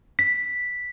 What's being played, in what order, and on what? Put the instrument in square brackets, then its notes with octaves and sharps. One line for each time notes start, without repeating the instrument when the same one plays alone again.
[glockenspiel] B6